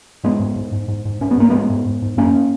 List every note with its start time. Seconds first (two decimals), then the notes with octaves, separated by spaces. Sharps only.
0.24 G#2 G#3 B3
0.40 G#2
0.56 G#2
0.72 G#2
0.88 G#2
1.05 G#2
1.21 G#2 C#4
1.31 B3
1.38 G#2 A#3
1.50 G#2 G#3 B3
1.70 G#2
1.86 G#2
2.02 G#2
2.17 F#2 A#3 C#4